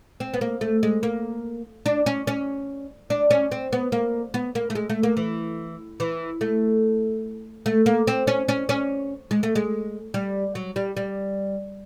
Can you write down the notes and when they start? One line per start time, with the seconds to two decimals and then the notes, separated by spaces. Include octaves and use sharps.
0.20 C4
0.34 B3
0.41 A#3
0.61 A3
0.83 G#3
1.03 A#3
1.86 D4
2.06 C#4
2.27 C#4
3.10 D4
3.31 C#4
3.52 C4
3.73 B3
3.92 A#3
4.34 B3
4.55 A#3
4.70 A3
4.75 G#3
4.90 A3
5.03 A#3
5.17 E3
6.00 E3
6.41 A3
7.66 A3
7.86 A#3
8.07 C4
8.27 C#4
8.48 C#4
8.69 C#4
9.31 G#3
9.43 A3
9.55 G#3
10.14 G3
10.55 F#3
10.76 G3
10.97 G3